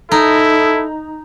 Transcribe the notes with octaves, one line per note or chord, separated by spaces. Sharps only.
D#4 E4 A4